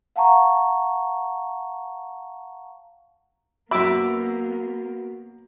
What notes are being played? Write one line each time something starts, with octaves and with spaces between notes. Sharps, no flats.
F5 F#5 A5 A#5 C#6
F#2 A#3 B3 F#4 E5 B5 D6